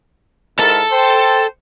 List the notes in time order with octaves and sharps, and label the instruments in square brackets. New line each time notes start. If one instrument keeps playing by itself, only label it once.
[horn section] G#2 E4 A#4 [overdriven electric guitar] A4 A5
[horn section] C5 G5